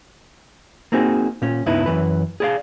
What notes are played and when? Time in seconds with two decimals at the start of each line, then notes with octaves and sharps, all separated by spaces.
0.92 A#3 C4 D#4 F#4 G#4
1.42 A#2 C#4
1.66 C#2 G2 B3 D#4 E4 B4
1.86 F#2 E3 B4
2.40 G#4 D5 F5